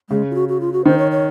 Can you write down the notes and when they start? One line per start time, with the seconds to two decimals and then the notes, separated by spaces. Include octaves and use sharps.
0.10 C#3 G#3
0.31 F4
0.35 F#4
0.49 F#4
0.61 F4
0.73 F#4
0.85 D#3 C5
0.98 C#5
1.11 C#5